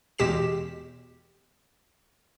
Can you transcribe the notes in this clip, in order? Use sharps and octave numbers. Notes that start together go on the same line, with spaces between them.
E2 B2 G#3 G4 B6 E7